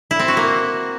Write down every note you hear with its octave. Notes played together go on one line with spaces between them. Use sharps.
E4
C4
F#4
A#3